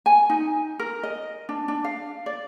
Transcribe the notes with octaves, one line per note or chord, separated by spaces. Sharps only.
G#5
D#4
A#4
D#5
D4
D4
F5
D5